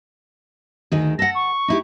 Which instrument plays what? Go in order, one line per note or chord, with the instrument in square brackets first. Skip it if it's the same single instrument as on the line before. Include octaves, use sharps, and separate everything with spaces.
[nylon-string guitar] D2 D#3 G#4
[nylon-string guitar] A4 F#5 [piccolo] A#6
[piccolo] C#6
[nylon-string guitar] D#4 E4 G4